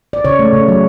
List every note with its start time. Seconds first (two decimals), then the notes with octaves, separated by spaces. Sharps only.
0.13 D5
0.24 C#3 C#5
0.39 A3
0.53 C#3
0.68 F#3